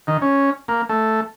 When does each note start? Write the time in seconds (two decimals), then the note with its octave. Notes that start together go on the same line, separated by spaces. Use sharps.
0.07 D#3
0.22 C#4
0.68 A#3
0.89 A3